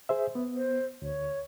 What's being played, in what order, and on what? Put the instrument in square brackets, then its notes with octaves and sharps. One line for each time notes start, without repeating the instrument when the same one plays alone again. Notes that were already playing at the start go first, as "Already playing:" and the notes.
[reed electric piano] G#4 C5 E5
B3
[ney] C5
[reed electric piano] D2 [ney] C#5